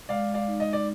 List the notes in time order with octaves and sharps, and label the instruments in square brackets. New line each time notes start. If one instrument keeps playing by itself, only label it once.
[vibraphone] G#3 [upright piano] D5 F5
[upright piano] D5 F5
[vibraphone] D#4
[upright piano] D#5
D5